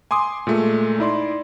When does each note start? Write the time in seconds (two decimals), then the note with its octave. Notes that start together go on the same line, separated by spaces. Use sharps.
0.11 G#5 C6 D6 D#6
0.47 A#2 G#3 A3
0.99 D#4 E4 D5 C6